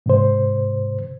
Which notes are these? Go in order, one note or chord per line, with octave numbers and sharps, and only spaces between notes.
G#2 C3 C5